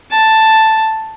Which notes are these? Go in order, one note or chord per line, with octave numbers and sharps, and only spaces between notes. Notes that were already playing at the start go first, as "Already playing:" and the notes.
A5